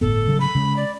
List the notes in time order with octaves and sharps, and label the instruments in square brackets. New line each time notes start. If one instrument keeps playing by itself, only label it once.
[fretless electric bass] G1 A2 B3 [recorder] A4
[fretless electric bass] C#3 F#3 G3
[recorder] B5
[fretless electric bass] C#3 G#3
[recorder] D5